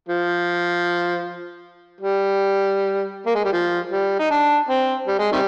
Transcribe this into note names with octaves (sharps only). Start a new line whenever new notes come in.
F3
G3
A#3
G#3
G3
F3
G3
D#4
D4
C4
G3
G#3
C3 D#3 G3